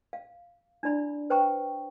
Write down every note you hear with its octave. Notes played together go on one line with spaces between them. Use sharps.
F5
D4 E4 D5 B5
B4 C5 G5 A#5 C#6